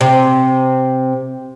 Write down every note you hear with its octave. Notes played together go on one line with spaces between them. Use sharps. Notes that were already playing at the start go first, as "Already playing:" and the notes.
C3